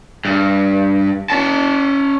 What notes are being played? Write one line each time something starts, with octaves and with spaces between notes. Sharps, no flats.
G2
C#4 A5